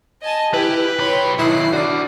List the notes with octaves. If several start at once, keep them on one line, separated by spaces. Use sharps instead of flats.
D#5 G#5 A5
E4 G4 B4
B1 C#5 G5 B5 C6
B1 D#3 E4 F#6 C7
D4 F#4 D5